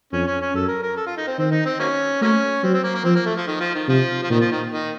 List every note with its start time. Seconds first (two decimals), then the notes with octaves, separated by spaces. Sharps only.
0.12 F2 C#4
0.27 C#4
0.41 C#4
0.54 F#2 A4
0.68 A#4
0.82 A#4
0.97 A4
1.06 F4
1.17 D#4
1.27 C4
1.38 D#3 C4
1.51 D#4
1.65 C4
1.79 F#3 A#3 C#4
2.21 F#3 A3 A#3 C#4
2.63 F#3 C4
2.74 C4
2.83 A#3
2.95 A#3
3.04 F3 C4
3.15 A#3
3.26 A3
3.36 F3
3.47 D#3
3.60 F3
3.75 D#3
3.88 C3 F3
4.23 F3
4.30 A#2 D#3
4.40 F3
4.51 D#3
4.71 D#3